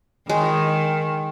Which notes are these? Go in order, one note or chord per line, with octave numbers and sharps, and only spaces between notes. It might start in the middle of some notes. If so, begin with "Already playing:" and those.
D#3 G#3